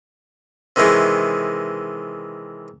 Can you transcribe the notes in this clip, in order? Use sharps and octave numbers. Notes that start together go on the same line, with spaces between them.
C3 D#3 E3 G#3